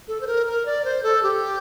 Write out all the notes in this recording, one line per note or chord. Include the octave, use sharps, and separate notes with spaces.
A4
C5
A#4
A#4
D5
C5
A4
G4